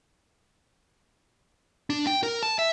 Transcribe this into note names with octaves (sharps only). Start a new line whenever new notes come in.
D4
G5
A#4
A5
E5